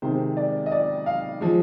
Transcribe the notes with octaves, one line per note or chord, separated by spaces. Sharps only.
C3 D#3 G#3 C5
D5
D#5
D5
F5
F3 G#3